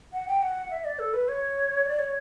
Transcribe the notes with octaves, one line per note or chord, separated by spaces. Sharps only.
F#5
G5
F#5
E5
D5
A4
B4
C#5
D5
C#5